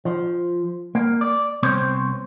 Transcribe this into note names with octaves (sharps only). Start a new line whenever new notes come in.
F3
A#3
D5
C2 B3 C4 C5 C#5